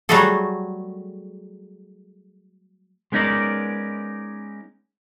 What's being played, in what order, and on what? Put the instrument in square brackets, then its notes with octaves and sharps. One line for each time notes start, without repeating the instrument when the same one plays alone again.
[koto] F#3 G3 A3 F#4 G#4 A4
[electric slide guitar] G#3 B3 C#4 D#4 A#4 D5